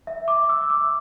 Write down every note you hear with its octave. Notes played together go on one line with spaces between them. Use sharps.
E5
D6
E6
D6